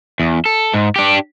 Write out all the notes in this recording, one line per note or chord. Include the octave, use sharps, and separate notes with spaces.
E2
A4
G#2
D4 G4